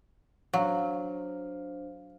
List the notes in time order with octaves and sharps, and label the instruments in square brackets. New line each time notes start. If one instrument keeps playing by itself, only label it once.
[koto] F#3 [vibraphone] D4 C5 [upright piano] F5